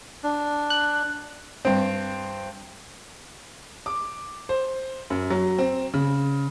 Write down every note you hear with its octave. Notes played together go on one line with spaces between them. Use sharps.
D4
F#6
G2 C4
D6
C5
F#2
F#3
C4
C#3